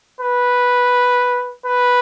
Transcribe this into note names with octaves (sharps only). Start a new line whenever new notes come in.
B4
B4